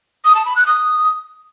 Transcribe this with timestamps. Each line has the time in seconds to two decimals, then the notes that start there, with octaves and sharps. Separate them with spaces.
0.25 D#6
0.35 A5
0.46 B5
0.56 F#6
0.67 D#6